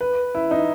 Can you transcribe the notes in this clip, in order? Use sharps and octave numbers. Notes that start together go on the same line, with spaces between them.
B4
E4
D#4